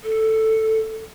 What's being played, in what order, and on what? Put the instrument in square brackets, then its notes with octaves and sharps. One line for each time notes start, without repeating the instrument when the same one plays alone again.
[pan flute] A4